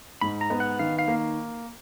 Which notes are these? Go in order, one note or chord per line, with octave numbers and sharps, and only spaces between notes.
G#2 B5
A#5
B3
F#5
D#3 F5
F5
A#3